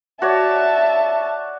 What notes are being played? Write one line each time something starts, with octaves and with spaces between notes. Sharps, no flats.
F#4 C#5 D5 E5 A5